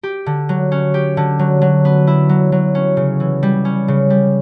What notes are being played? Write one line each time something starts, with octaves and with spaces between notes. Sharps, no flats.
G4
D3
F#3
C#4
G4
D3
F#3
F#3
B3
E4
F#3
F#3
C#4
C#3
E3
G3
C#4
C#3
G3